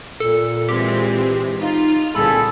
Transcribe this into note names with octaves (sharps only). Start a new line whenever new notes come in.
A#2 A4
E3 G#3 C4 G4
D#4 F4
C2 A#2 D3 G#4 A4 B5